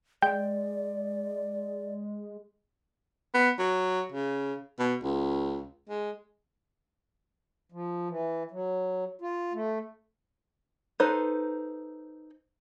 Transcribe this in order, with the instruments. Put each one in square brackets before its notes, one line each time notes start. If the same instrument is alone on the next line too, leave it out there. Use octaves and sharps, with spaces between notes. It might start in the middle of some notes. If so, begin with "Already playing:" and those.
[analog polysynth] G#3 [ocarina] D5 [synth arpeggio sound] G5
[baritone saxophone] B3
F#3
C#3
B2
C#2
G#3
[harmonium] F3
E3
F#3
F4
A3
[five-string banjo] D#4 A4 B4 C5